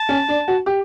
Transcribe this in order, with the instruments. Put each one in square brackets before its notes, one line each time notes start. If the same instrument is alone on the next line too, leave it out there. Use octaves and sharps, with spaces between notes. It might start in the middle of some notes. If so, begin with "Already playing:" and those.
Already playing: [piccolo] A5
[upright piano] C#4
D4
F#4
G4